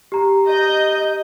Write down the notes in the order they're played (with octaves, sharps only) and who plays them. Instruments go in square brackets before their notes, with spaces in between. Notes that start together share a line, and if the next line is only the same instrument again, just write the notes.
[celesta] G4 A#5
[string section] D#5 G6